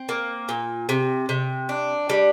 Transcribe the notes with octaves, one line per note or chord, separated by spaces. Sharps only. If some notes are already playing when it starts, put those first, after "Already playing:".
Already playing: C4
A#3
A#2
C3
C3
D4
G3